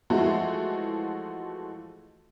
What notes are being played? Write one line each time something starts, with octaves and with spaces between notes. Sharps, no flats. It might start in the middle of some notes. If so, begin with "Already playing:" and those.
E3 F3 G#3 A3 F#4